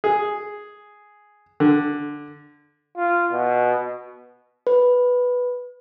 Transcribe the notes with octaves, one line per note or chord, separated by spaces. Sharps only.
G#4
D3
F4
B2
B4